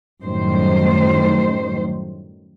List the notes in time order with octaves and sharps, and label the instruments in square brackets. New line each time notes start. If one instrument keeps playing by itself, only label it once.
[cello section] F#2 A2 D#3 G3 A3 C5